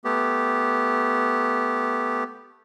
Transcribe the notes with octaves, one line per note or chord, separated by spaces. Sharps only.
A3 B3 G4